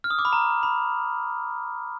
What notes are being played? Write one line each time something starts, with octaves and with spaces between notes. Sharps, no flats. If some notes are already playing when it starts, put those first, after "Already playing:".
F6
D#6
D6
B5
A#5
B5